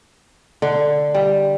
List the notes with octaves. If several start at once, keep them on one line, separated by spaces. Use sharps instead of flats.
D3
G3